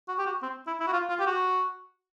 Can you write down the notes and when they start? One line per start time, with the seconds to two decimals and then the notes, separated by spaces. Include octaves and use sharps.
0.08 F#4
0.19 G4
0.26 F#4
0.43 C4
0.67 E4
0.80 E4
0.87 F#4
0.93 F4
1.09 F4
1.19 G4
1.26 F#4